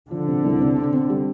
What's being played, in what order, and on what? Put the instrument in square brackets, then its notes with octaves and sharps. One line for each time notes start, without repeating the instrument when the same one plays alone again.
[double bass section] D3 [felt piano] F3
[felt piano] C3
C2
C3
C4
C4
G3